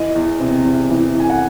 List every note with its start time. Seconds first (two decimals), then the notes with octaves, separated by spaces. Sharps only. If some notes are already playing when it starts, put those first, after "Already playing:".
Already playing: E3 D#5
0.15 E2
0.40 C3
0.65 E2
0.90 E3
1.15 E2 G#5
1.30 F#5